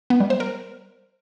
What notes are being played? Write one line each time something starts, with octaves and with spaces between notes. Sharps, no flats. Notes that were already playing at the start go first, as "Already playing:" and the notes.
B3
G3
C5
A#4